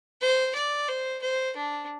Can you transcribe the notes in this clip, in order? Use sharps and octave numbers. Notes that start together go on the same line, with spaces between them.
C5
D5
C5
C5
D4